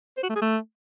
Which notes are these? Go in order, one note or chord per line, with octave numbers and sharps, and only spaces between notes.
C5
F#4
A3
G#4
A3